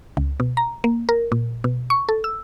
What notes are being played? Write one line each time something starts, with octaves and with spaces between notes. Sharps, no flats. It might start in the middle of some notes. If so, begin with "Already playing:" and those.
C#2
B2
A#5
A#3
A#4
A#2
B2
C#6
A4
E6